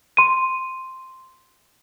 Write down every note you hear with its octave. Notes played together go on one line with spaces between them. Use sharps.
C6 D#7